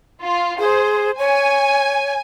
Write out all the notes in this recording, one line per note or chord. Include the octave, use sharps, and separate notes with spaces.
F4
G#4 C5
C#5 G#5